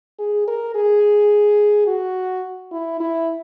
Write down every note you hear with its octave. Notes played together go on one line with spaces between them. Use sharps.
G#4
A#4
G#4
F#4
E4
E4